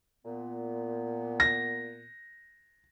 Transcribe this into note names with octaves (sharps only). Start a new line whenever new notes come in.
A#2 B3
A#6